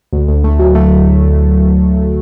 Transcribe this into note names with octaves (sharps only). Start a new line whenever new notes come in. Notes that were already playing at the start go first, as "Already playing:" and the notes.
D2
D2
A3
F#3
A3